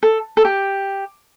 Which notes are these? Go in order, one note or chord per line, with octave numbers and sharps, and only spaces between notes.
A4
A4
G4